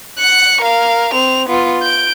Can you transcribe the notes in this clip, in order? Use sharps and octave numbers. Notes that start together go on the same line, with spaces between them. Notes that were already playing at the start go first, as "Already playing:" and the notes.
F#6 C#7
A#4 F5
C4 F7
B3 F4
G6 D7